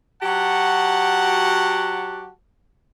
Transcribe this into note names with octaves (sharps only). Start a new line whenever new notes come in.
F#3 F#4 G4 F#5 A5